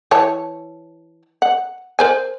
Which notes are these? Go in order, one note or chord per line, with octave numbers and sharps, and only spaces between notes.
E3 C#5 A5
F#5
A#4 C5 G#5